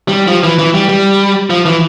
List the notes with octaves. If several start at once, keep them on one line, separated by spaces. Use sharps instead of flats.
G3
F3
E3
E3
G3
G3
F3
E3